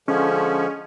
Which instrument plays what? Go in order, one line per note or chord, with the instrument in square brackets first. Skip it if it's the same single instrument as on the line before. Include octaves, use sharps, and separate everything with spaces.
[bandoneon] D3 F3 [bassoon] G#3 [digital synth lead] C#4